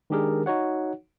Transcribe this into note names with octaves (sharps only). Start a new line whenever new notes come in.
D#3 G#3 D4 G4 G#4 A#4
D#4 F#4 C#5 F#5